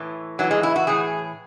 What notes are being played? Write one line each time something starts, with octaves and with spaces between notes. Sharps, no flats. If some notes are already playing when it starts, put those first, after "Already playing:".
Already playing: A2 E3
A2 E3 F#3
G#3
E4
F#4
A2 E3 G#4